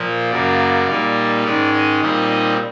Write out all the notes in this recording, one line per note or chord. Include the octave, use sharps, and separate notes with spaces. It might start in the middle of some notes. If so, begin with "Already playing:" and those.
Already playing: A#2 F3 A#3
F#2 C#3 F#3 A#3 D5
A#2 G3 A#3 D#4
G#2 D#3 G#3 C#4 D5
D#5
A#2 G3 C4 D#4 D#5
D#5